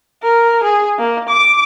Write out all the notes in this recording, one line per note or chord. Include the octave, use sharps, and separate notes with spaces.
A#4
G#4
A#3
D6